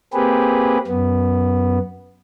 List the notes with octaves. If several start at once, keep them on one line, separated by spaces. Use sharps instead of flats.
A#3 C4 G4 G#4 B4
F#2 B3